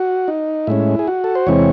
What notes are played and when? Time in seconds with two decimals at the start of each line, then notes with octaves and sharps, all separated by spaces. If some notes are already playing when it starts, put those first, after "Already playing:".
Already playing: F#4
0.28 D#4
0.67 A2 G#3 C#4 E4
0.99 G#4
1.07 F#4
1.24 A4
1.35 C5
1.47 E2 C3 E3 G#3 C4 C#5